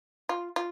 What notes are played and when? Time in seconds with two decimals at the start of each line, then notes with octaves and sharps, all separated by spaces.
0.29 F4
0.56 F4